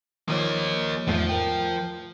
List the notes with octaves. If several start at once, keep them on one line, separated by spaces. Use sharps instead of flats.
D#3 F3 A#3 C#5 D#5
E2 G#2 F3 A3
A#4 G5